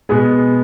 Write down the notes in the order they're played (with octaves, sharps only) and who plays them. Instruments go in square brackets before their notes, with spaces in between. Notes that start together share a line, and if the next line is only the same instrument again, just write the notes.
[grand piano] B2 G#3 B3 G#4